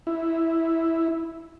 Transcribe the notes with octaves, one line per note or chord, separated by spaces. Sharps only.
E4